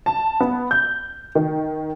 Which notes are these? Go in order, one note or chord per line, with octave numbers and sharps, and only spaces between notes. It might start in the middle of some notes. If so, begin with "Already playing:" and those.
A5
B3
G6
D#3